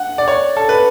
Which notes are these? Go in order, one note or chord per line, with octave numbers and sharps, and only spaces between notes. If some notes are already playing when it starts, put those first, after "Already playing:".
Already playing: F#5
D5
C#5
A4
B4